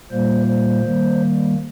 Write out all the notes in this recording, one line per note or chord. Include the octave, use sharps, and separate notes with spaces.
A#2 G3 A#3 C5
C5
D#3 G3 A#3